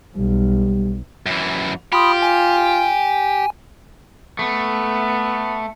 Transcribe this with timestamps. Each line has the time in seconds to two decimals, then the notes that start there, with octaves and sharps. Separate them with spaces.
0.16 B1 G3
1.26 F#2 E3
1.93 F4 G4 B5 C6 D#6
2.22 G#5
4.39 A3 B3